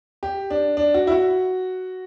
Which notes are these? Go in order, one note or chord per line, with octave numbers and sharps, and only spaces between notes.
G4
D4
D4
F#4
E4
F#4